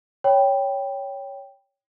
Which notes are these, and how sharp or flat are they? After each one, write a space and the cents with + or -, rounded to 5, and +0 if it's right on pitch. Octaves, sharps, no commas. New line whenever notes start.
C#5 +5 G5 +0 B5 +0